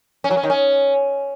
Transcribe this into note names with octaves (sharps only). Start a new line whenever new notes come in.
C#4
F#3
C#4
D#3
C#4